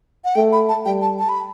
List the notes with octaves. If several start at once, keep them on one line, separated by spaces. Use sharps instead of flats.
F#5
A3 G5
B5
A5
G3 G5
A5
A5
B5